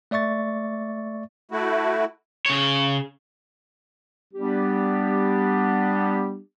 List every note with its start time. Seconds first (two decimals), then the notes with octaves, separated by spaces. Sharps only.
0.11 A3 D5 E5 C#6 A6
1.51 A3 E4 F#4
2.46 C#3 C#5
4.34 G3 B3 D4 G4